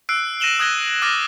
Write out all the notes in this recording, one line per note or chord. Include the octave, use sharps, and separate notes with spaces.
E6 F#6 C7 D7
F#6 A#6 D#7 E7 F#7 G7
D#6 F#6 G#6 A#6 G7
D6 F6 F#6 A6 A#6